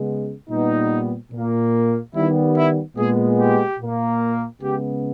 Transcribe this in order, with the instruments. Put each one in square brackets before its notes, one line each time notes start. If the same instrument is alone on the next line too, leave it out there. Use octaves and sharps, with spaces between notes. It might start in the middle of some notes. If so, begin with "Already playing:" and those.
Already playing: [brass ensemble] C#3 G#3 B3
A#2 G3 B3 D#4
A#2 A#3
D#3 G3 B3 E4
E4
A#2 G#3 B3 G#4
G4
A#2 A#3
C#3 G#3 B3 G4